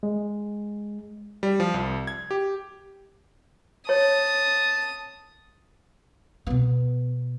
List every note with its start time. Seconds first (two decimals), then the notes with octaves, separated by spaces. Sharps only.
0.03 G#3
1.43 G3
1.60 F3
1.74 C2
2.07 G#6
2.31 G4
3.89 C#5 A5 D#6
6.47 B2 B3